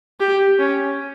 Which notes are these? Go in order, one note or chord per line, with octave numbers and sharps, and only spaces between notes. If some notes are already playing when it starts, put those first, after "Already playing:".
G4
C#4